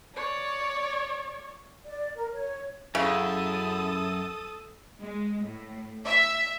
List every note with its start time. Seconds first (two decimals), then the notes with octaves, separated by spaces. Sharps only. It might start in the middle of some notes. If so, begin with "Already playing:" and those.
0.15 C#5 D5
1.86 D5
2.16 A#4
2.33 C#5
2.95 F#2 C#3 E4 A4 D#6
5.01 G#3
5.42 A2
6.06 E5